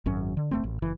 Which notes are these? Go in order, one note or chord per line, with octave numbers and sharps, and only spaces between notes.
G#1 F#2 C#4
D3
E1 A3 C4
A1
F#1 E3